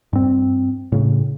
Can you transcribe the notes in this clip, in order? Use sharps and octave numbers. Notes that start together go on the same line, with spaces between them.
G2 C4
A2 C#3